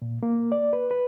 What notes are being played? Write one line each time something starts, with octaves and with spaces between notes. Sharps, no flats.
A#2
A#3
D5
B4
B4